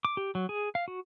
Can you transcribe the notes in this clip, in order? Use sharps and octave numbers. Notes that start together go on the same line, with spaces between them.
D6
G4
F#3
G#4
F5
F#4